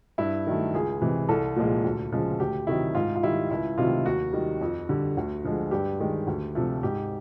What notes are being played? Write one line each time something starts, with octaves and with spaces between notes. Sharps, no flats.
G2 E4
D#3 F#3 A3
C#2 G#4
C3 E3 G#3
C2 A4
A#2 F3 G#3
D2
C#3 F3 G#3
D2 G4
C3 D#3 F#3 E4
G#2 F4
F4
D#3 G3 E4
C#2 E4
C3 D#3 F#3 A3 F4
D#2 F#4
D#3 G3
F2
D3 G3
D2
D3 F3 G#3
G2 G4
D#3 G#3
D2
C3 F3 A3
G#2 G4